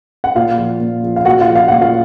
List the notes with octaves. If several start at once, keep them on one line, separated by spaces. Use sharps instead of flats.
F#5
A#2 F4 F5
F3
A#2
F3
F5
A#2 F#4 F#5
F4 F5
F3
F5
A#2 F#5
F4 F5